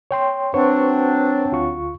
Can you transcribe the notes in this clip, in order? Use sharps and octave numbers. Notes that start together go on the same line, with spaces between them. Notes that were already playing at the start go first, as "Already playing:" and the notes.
C#5 G5 C6
F#3 C4 D4 B4 C5 C#6
D2 F4 C#6